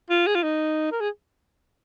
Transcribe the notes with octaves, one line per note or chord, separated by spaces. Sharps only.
F4
G#4
F4
D#4
A#4
G#4